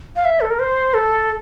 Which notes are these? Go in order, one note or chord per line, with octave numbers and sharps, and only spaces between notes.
F5
E5
A4
A#4
C5
A4